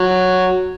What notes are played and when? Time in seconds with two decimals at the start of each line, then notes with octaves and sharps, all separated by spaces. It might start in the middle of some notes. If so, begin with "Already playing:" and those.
Already playing: F#3